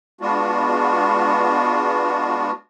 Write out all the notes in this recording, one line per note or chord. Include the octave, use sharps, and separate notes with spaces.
G#3 B3 D4 F4 F#4